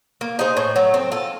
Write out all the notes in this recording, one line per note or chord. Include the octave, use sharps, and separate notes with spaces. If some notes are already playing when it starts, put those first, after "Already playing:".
A#3
D#4 G#4 C5
A2
F#3 A3
C4
F4 A4